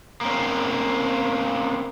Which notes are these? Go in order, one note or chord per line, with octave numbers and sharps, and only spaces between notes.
A#3 C4 C#4